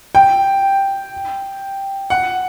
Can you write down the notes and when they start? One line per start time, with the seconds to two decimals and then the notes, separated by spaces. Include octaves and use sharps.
0.15 G5
2.10 F#5